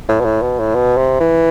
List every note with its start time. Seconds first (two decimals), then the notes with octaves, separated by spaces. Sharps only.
0.09 A2
0.20 B2
0.25 A2
0.42 B2
0.59 A2
0.75 B2
0.97 C3
1.20 E3